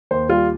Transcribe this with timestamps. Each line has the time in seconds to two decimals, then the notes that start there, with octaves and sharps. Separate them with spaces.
0.11 D#2 C5
0.29 G3 F4